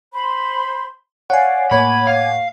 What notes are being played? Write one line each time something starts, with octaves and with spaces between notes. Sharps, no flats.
C5 B5 C6
C#5 D5 F5 F#5 G#5
A2 A#3 C#5 G#5 B5 D6 G#6
F5